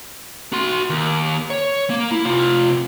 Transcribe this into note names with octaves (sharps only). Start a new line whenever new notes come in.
F#4 C6
D#2
C#5
A#3
E4
C3 F4